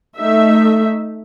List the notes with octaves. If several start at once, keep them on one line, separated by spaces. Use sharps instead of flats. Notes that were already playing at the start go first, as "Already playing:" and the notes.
A3 D#4 E5